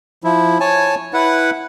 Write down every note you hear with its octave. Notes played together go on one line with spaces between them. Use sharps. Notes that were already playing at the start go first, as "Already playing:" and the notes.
F3 E4
C#5 G#5 A5
E4 B4 F#5